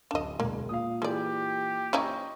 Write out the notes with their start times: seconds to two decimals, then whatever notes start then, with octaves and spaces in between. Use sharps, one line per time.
0.11 D1 D4 D#5 E7
0.40 E1 A#3
0.69 A#2 F5 D#6
1.02 E3 G#3 G4 D5
1.93 C#4 D#4 E4 C5 D#5 C#6